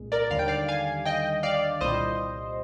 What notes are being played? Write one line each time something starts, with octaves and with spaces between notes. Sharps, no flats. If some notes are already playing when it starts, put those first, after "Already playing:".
Already playing: C2 A#2 G#3
A#4 D5
D#2 D3 G3 F5
G5
D5 F5
F5 G#5
D#5 G5
D5 F5
C2 A#2 G3 C5 D#5